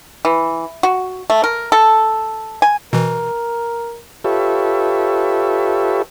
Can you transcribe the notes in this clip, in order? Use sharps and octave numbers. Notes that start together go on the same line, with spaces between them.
E3
F#4
A3
A#4
A4
G#5
B2 E3 A#4
F4 G4 A4 B4 C#5 E5